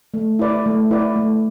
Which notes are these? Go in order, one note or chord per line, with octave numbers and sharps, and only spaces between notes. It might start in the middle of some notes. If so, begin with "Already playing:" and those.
A3
E4 B4 D5
A3
E4 B4 D5
A3